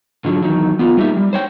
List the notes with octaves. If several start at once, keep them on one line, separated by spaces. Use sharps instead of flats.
G#2 D3 F3 F#3
E2 D#3 F#3
B3 F4
G3 A3 A#3 D#4 G4 E5
G3
C5 C#5 G5